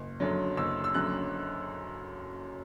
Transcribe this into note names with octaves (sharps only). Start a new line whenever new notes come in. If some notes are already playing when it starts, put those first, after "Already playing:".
Already playing: F#1
F#2 D3 F#3
F#1 E6
E6
F#2 D3 F#3 F#6